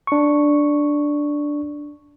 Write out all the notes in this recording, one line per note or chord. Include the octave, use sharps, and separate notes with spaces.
D4 C#6